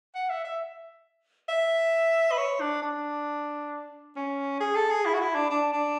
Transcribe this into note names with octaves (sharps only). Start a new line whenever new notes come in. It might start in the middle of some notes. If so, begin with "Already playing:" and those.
F#5
E5
E5
E5
B4
C#5
D4
D4
C#4
G#4
A4
G#4
E4
F#4
E4
D4
D4
D4